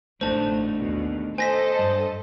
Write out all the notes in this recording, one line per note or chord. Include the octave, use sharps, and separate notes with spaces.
A1 E2 A2 A3 D4 D#4 C5 A5
D#2 B2
A4 C5 D#5 G#5 A#6 B6
G2